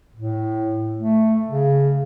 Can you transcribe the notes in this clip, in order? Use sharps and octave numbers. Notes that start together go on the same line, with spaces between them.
A2
A3
C#3